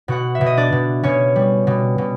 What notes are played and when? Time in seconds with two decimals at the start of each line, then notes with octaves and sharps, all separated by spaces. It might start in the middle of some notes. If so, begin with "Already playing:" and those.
0.08 B2 F#4 F#5
0.35 E5
0.41 B2
0.46 D#5
0.57 D4 D5
0.72 B2
1.03 B2 C#4 C#5
1.36 G3
1.67 B2
1.98 B2